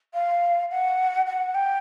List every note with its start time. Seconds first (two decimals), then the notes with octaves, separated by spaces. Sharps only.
0.14 F5
0.71 F#5
1.26 F#5
1.54 G5